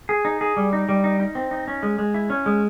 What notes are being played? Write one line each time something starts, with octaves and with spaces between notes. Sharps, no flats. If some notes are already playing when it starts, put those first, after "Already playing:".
G#4
D#4
G#4
G3
D#4
G3
D#4
D#4
C4
D#4
C#4
G#3
G#3
E4
C#4
G#3